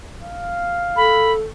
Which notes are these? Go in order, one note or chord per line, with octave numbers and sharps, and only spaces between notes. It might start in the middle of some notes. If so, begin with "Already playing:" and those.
F5
A4 B5